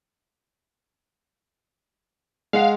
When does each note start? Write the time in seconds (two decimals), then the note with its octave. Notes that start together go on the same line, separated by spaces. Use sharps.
2.53 G#3 F5 F#5